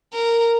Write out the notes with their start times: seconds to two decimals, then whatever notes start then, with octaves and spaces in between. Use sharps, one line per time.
0.13 A#4